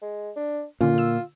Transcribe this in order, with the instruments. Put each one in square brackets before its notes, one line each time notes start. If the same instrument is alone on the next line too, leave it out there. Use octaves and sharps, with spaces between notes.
[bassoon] G#3
D4
[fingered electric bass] A#2 [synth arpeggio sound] D3 C#4 [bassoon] F4
[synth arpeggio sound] D3 E6